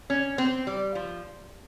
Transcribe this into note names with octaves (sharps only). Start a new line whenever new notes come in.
C#4
C4
G3
F3